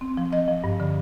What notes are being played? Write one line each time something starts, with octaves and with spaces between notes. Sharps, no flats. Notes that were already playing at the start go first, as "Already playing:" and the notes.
C4
F3
F3 D#5
F3
G2
D3